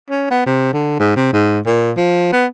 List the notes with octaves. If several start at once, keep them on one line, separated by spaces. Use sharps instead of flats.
C#4
B3
C3
D3
G#2
C3
G#2
A#2
F3
B3